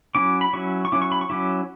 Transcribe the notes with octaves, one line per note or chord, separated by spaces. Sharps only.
F#3 C#4 E4 D6
B5
F#3 C#4 E4 C#6
C#6
F#3 C#4 E4 D6
C#6
B5
C#6
F#3 C#4 E4 D6